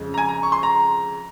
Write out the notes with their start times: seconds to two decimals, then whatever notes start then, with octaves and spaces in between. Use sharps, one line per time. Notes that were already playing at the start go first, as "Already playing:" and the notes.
Already playing: F2 C#3 G#3
0.14 A#5
0.18 G#5
0.29 A#5
0.43 C#6
0.52 C6
0.63 A#5